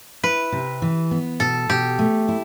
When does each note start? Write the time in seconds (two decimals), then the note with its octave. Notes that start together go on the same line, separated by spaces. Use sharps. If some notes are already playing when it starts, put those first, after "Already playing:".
0.24 E4 B4
0.52 C3
0.82 E3
1.11 B3
1.40 B2 A4
1.70 B2 G4
1.99 A3
2.29 E4